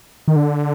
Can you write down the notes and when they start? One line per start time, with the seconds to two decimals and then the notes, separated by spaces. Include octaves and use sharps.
0.28 D#3
0.36 D3